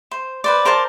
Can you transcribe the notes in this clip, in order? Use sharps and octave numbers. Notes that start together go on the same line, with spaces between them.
C5
B4 C5 D5
A#4 C5 D5 A5